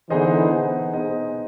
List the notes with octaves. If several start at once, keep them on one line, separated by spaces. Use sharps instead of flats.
D3 E3 B3 D#4 G#4 C5 D#5
B3 D#4 G#4 C5 D#5
B3 D#4 G#4 C5 D#5